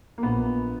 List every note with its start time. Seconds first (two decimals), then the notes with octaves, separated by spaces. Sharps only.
0.18 A#3
0.23 A#1 B3